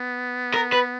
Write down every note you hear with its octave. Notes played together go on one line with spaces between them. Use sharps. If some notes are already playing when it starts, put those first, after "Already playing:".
Already playing: B3
A#4
B4